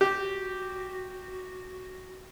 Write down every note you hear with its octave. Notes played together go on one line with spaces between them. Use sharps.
F#4 G4